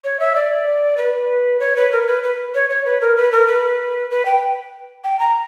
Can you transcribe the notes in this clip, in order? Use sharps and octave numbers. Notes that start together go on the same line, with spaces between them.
C#5
E5
D5
B4
C#5
B4
A#4
B4
B4
C#5
C#5
B4
A#4
B4
A#4
B4
B4
G5
G5
A#5